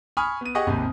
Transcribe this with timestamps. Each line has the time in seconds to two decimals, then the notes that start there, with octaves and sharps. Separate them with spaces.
0.17 G#5 B5 C#6 D#6 F6
0.41 B3 D#7
0.55 G4 G#4 D#5 F#5 C#6 D#6
0.67 G#1 D#2 C3